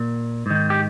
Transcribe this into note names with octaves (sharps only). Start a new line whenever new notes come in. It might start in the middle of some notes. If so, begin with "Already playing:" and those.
Already playing: A#2
G#2 D#3
G4